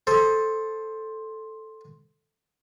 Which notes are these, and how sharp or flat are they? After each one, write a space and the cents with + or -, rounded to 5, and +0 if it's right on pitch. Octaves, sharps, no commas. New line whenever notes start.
A4 +0 C5 +10 D#6 +30